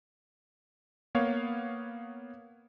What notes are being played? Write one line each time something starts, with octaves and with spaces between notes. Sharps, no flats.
A#3 B3 C#5 F5